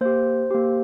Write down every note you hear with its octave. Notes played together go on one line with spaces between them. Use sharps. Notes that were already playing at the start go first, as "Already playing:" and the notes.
A#3 G4 C5
A#3 G4